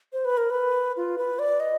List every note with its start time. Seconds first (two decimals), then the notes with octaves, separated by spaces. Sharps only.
0.13 C5
0.25 B4
0.37 A#4
0.50 B4
0.97 F4
1.18 B4
1.39 D5
1.60 D#5